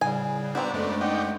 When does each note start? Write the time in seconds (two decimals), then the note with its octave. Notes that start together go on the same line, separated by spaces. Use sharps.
0.01 A2 C#3 G3 G#5
0.55 B3 C4 D4 F#4 C5 A#5
0.74 F#2 G#3 A3 A4
1.01 D#4 D5 F#5 G5